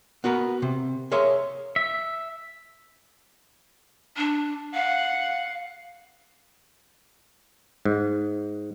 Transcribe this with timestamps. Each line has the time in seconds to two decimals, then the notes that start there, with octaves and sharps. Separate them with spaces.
0.24 B3 F#4 A#4 B4
0.62 C3
1.12 G#4 A#4 C#5 E5 F5 C6
1.76 E5
4.17 D4
4.74 F5 F#5
7.85 G#2